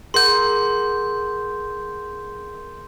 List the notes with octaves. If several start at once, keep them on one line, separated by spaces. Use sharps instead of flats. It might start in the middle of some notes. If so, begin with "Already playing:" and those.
G#4 A#4 F#5 C6 G6